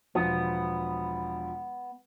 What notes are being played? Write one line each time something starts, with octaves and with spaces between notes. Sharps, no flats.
E1 F3 B3